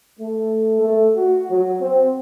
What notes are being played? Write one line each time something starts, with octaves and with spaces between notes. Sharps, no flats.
A3
A3
F#4
F#3
C4